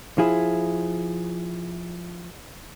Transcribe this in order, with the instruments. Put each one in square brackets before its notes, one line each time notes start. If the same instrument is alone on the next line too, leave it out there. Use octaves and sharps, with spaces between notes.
[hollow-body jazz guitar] F3 E4 G#4